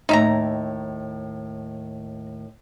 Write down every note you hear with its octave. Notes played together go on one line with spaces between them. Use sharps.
D#2 A2 D#4 E5 A#5